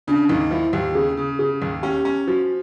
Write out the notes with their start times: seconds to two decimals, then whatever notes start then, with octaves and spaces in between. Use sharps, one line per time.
0.07 C#3 D4
0.29 D#2 D#4
0.51 F3 E4
0.73 D#2 G4
0.95 C#3 G#4
1.17 C#3
1.39 C#3 G#4
1.62 D#2
1.83 C#4 G4
2.05 C#4
2.27 F3 F#4